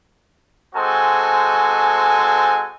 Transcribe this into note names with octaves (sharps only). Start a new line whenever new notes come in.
G#3 C4 F#4 A4 C5 G#5